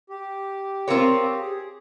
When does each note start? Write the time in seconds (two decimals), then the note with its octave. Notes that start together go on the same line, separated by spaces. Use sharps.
0.10 G4
0.88 C4 F4 A#4 C#5
1.41 G#4